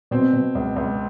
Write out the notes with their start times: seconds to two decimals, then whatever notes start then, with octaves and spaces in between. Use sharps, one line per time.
0.11 B2 C4
0.33 B2
0.55 C#2
0.76 C#2